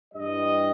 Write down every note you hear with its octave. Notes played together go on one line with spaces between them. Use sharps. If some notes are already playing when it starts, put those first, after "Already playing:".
G2 E3 G3 D#5